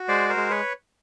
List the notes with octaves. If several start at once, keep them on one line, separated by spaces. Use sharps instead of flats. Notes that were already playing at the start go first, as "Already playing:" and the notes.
Already playing: F#4
G#3 C5 D5
A#4 C5
G#3
B4 C#5